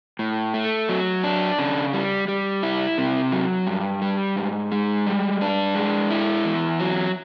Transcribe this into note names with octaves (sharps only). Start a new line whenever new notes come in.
A2
A3
F#3
D4
C#3
G3
G3
E4
C3
F#3
G2
G3
G#2
G#3
G3
D4
G#3
E4
E2
F#3